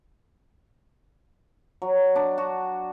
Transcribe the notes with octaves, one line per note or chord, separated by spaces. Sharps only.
F#3
D4
F#4